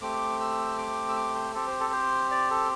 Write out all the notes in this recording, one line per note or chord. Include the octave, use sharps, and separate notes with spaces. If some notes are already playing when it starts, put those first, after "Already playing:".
A3 C4 G4 D6
E6
D6
E6
D6
C5
C4 G4 A4
C5
A4
C5
D5
A4